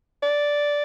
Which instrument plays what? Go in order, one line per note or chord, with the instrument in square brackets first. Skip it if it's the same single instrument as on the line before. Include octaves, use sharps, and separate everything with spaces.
[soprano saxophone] D5